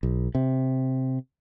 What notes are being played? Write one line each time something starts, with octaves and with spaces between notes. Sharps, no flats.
B1
C3